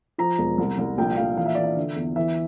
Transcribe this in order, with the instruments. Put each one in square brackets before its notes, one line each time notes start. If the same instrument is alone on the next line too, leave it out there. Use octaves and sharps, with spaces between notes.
[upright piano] F3 A#5
E1
C2
C2
A#1 G5
A#1 F5
E3 F5
E5
E3 D5
E5
D3
E2
E3 E5